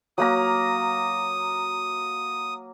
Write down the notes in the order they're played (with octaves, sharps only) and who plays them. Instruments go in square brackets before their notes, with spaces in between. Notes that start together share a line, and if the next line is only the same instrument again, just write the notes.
[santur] F#3 A#3 A#5 [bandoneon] D#6